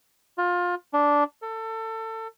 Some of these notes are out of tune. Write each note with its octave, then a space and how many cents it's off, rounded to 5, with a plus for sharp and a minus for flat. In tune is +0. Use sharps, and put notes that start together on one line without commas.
F4 +25
D4 -10
A4 +25